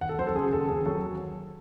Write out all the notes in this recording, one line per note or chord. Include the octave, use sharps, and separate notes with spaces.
D#2 F#5
A4
F#3 C5
A4
C#3 G#4
D#2 A4
D#2 G#4
F#3 A4